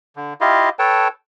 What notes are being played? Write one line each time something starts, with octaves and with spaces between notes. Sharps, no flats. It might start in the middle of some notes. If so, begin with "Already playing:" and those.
D3
E4 F4 G4 D#5 F5
A4 B4 C#5 G5 A5